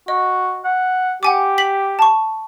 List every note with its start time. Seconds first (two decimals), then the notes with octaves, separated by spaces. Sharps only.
0.08 F#4 D#5
0.65 F#5
1.23 G4 F#5 G#5 D6
1.58 B6 F#7
1.99 A5 C#6